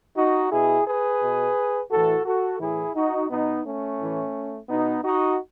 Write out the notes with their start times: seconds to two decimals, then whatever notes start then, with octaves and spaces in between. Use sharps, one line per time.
0.17 D#4 F#4
0.52 B2 E4 G#4
0.86 G#4 B4
1.21 B2
1.91 A2 E3 F#4 A4
2.25 F#4 A4
2.60 A2 E3 E4 G#4
2.95 D#4 F#4
3.30 B2 B3 D#4
3.65 A3 C#4
4.00 A2 E3
4.69 B2 B3 D#4
5.04 D#4 F#4